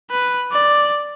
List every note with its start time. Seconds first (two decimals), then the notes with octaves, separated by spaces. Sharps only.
0.11 B4
0.52 D5